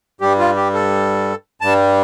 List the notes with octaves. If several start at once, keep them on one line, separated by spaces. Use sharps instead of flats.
G2 G3 G4
F4
G4
A4
G2 G3 A5